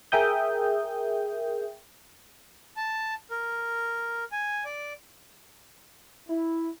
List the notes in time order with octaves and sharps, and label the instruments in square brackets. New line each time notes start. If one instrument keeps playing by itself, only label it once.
[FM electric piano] G#4 A#4 E5 G5 D#6 G6
[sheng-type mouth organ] A5
A#4
G#5
D5
[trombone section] E4